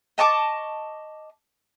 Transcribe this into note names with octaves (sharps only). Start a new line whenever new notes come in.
D#5 A5 C#6 D6